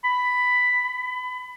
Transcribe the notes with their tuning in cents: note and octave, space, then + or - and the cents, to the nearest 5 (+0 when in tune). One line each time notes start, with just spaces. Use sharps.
B5 +10
B5 +25